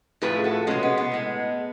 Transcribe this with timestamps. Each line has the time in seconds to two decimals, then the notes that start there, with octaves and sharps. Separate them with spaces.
0.22 A2 F3 A3 G#4 B4
0.44 F#4 A4
0.67 B2 G#3 C#4
0.83 B3
0.98 B3
1.12 A2 G#3